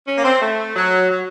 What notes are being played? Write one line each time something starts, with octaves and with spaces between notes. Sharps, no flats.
C#4
A#3
C4
A3
F#3
F#3